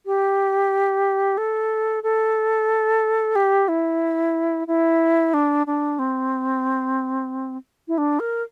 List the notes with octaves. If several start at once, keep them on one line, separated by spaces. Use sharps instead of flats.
G4
A4
A4
G4
E4
E4
D4
D4
C4
E4
D4
A#4